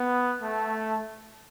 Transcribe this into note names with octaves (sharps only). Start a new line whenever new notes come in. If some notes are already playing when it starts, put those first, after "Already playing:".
Already playing: B3
A3